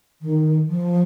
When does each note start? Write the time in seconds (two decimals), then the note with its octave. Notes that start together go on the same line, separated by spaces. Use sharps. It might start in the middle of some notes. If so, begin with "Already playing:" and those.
0.22 D#3
0.69 F3